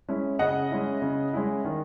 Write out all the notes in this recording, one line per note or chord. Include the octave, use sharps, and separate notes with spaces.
G#3 C#4 E4
C#3 D#5 F#5
G#3 C#4 E4
C#3
G#3 C#4 E4
D#3